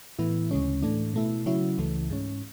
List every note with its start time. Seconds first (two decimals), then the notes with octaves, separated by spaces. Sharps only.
0.19 A2 E3 B3 E4
0.51 D2 C#3 G#3 C#4
0.82 A2 E3 A3 D4
1.14 B2 A3 E4
1.46 C#3 F#3 C#4 E4
1.78 C#2 C#3 E3 A3
2.10 G#2 G#3 C#4